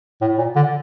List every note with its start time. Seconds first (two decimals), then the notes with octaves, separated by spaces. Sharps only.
0.21 A2
0.38 A#2
0.56 D3